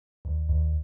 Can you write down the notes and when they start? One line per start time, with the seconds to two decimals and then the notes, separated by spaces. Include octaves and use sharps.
0.25 D#2
0.49 D#2